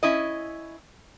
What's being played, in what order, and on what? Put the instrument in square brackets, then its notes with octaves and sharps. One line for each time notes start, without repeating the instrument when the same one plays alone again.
[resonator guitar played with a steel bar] C#4 E4 D#5